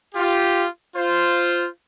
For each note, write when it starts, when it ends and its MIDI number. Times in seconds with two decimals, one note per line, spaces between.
0.15 0.65 65
0.15 0.65 67
0.96 1.66 65
0.96 1.66 72